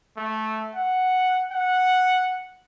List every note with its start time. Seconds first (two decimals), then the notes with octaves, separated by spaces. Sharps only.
0.17 A3
0.75 F#5
1.51 F#5